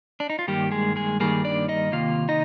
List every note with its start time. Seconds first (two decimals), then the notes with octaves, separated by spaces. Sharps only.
0.20 D4
0.30 D#4
0.39 F4
0.47 G2 D#3 G3 A#3 G4
0.72 G#3 G#4
0.96 G#3 G#4
1.20 G2 D#3 G3 A#3 G#4
1.44 D4 D5
1.68 D#4 D#5
1.92 C3 D#3 A#3 F4 F5
2.29 D#4 D#5